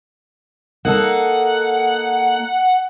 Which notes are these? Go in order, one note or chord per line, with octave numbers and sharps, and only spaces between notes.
A#3 D#4 A4 F#5